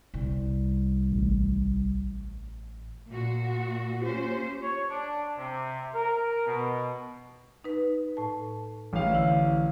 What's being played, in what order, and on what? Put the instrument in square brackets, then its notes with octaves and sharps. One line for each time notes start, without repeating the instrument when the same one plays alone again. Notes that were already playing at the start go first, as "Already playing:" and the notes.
[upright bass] C2 G3
[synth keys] A1
[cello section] A#2 F#4
[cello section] A#3 C#4 C5 [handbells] F4 G4
[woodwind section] C#5
D4
C3
A#4
B2
[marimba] D#4 B4
A2 A5
[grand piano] A1 F5
[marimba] D3 E3 E4